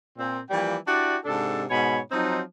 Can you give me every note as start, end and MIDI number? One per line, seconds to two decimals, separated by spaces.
0.18 0.39 46
0.18 0.39 60
0.50 0.76 52
0.50 0.76 53
0.50 0.76 55
0.50 0.76 58
0.50 0.76 79
0.87 1.17 62
0.87 1.17 64
0.87 1.17 66
0.87 1.17 67
0.87 1.17 74
1.25 1.64 44
1.25 1.64 48
1.25 1.64 62
1.25 1.64 69
1.70 2.00 44
1.70 2.00 47
1.70 2.00 73
1.70 2.00 80
1.70 2.00 83
2.11 2.41 53
2.11 2.41 54
2.11 2.41 60
2.11 2.41 63